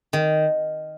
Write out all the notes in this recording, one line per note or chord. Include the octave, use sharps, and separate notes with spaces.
D#3